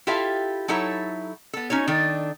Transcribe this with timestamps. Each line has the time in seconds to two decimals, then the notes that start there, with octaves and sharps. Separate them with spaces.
0.07 E4 F4 G4 A4 E5 F5
0.68 F#3 D#4 E4 A4 C#5 E5
1.53 B3 A4
1.70 C#4 D#4 F#4 C#5
1.88 D#3 D4 D#4 A4